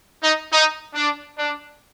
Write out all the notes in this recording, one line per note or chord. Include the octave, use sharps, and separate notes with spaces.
D#4
D#4
D4
D4